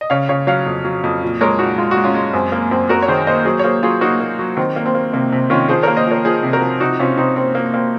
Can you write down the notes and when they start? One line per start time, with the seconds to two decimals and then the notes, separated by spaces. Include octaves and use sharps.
0.01 D#5
0.10 C#3 C#5 F5
0.28 C#3 C#5 F5
0.47 F#3 C#5 F5
0.66 F2
0.85 F#3
1.04 F2
1.22 A#2
1.41 G#3 A#4 C#5
1.59 A#2 D#4 F#4
1.78 G#3 F4
1.91 F#4
1.97 G#3
2.04 C#4 F4
2.15 G#3
2.33 F#2 C4
2.52 A#3
2.71 F#2 C4
2.89 F#2 F#4 A#4
3.02 C#5
3.08 D#3 G#4 C5
3.27 A#3 C5 D#5
3.45 F#3 G#4 C5
3.59 C#5
3.64 A#3 G#4 C5
3.83 F#3 F4 G#4
4.01 A#3 D#4 F#4
4.20 A#3
4.39 F#3
4.57 D#3 C4
4.76 A#3
4.86 C4
4.94 A#3
5.13 C3 A#3
5.32 C3
5.50 D#3 C#4 F4
5.68 F3 G#4 C5
5.83 A#3 A#4 C#5
5.97 C5 D#5
6.07 F3 A#4 C#5
6.25 F3 G#4 C5
6.43 C3
6.53 F#4 A#4
6.62 F3
6.80 C3 D#4 F#4
6.99 C3 C#4 F4
7.17 C3 C4 D#4
7.36 A#3 C4
7.55 A#3
7.74 A#3 C4